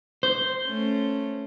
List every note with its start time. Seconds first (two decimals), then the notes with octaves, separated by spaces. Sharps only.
0.23 C5
0.65 A3 C#4